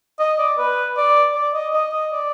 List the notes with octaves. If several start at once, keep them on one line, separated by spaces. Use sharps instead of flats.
D#5
D5
B4
D5
D5
D#5
D#5
D#5
D5